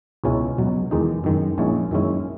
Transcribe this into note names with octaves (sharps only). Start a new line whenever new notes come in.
C#2 B2 G#3 C#4 E4
C#2 B2 F#3
E2 D#3 G#3 D#4
F#2 D#3 G#3
A#1 A#2 G#3 C#4 E4
F#2 D#3 G#3 C#4 E4